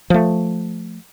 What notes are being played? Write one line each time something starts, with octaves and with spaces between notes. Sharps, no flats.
F3 A3